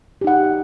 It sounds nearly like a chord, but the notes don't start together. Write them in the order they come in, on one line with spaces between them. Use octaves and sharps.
G4 D#4 F#5